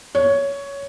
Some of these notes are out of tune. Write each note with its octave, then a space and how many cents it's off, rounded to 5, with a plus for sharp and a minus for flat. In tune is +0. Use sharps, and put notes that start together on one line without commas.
C#5 +10